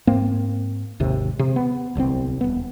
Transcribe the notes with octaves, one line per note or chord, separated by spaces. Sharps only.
G#2 A#3 C4
G#1 D#2 C3
C3
B3
D1 C2 C#3 C4
D#1 B3